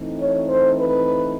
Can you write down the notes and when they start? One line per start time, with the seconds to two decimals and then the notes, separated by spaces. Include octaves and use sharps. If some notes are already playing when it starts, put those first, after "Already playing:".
Already playing: E3 A3 C4 D#4
0.19 C#5
0.49 C5
0.78 B4